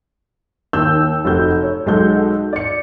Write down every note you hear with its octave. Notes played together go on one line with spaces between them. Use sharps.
D#2 E6 G6
F1 F#4 G6
C#5
B1 G#3 F#4 A4 G6
D5 C#7